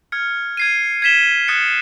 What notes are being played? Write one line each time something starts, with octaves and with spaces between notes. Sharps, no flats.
F6 G#6 C#7
G#6 C7 D#7
G#6 B6 E7 G7
D#6 F#6 A6 C#7